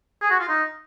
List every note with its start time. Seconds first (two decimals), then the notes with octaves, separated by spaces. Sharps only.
0.21 G#4
0.30 F#4
0.39 F4
0.49 D#4